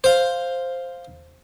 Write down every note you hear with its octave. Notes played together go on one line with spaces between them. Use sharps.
C5 F5